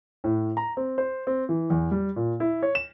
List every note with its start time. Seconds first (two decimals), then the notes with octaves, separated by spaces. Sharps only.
0.24 A2
0.57 A#5
0.77 C4
0.98 C5
1.27 C4
1.49 E3
1.70 E2
1.92 G3
2.16 A#2
2.40 E4
2.63 C#5
2.75 E7